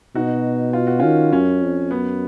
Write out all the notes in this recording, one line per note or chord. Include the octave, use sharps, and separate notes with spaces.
B2 D#4 F#4
F4
F#4
D#3 C#4 F4
F#2 C#4
F2
F#2 B3